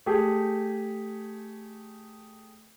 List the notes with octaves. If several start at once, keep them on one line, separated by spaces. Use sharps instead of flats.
A3 G4 G#4